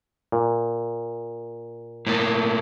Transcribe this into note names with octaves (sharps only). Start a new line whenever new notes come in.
A#2
A2 A#3